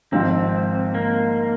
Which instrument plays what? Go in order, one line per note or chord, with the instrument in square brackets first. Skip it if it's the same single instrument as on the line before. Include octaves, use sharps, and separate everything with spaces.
[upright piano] G#1 G#2 F3 [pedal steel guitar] C4
[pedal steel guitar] A#3